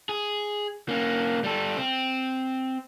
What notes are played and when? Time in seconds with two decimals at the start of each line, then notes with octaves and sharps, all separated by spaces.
0.09 G#4
0.89 A#3 C#4
1.44 G3 A4
1.77 C4